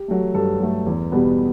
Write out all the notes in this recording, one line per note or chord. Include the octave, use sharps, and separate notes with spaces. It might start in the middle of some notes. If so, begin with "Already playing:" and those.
Already playing: G4
F#3 A3
G2 A4
F#3 A3
E2
B2 G3 B3